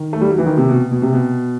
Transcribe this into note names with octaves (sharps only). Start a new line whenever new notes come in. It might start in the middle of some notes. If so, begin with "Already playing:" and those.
Already playing: D#3
A3
G3
F#3
E3
D#3
C3
B2
B2
C3
B2